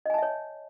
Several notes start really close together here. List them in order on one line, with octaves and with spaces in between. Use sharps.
D#5 G#5 A5 E5 C#5